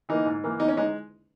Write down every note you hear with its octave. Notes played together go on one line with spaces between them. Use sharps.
E3 A#3 D#4
G#2
E3 A#3
E2 D#4
C#4
G#3 D#4